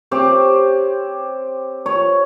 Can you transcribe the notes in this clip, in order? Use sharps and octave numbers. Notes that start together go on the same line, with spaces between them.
C4 G4 C#5
C#5